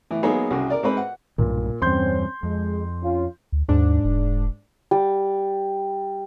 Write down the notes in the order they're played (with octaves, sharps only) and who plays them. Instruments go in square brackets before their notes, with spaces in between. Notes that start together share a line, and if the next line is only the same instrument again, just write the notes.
[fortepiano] A2 E3
F#3 G#3 A#3 B3 D#4 G#4
C2 C#3 F#4 G#4
A#4 D5
G#2 C4 B4
F#5
[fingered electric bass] B1 G2 [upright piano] A#2
[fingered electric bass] E2 G2 [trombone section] C4 C#4 [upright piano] C6 G6
[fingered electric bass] F2 [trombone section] G#3
[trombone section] C#4 F4
[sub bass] D2
[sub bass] D#2 [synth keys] G#2 D4
[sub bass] E1
[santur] G3